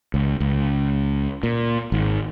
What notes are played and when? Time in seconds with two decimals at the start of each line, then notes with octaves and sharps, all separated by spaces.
0.14 C#2
0.40 C#2
1.43 A#2
1.92 G#1